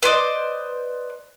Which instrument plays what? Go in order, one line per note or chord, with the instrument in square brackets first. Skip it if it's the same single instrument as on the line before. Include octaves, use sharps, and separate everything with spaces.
[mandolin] B4 C5 D5 D#5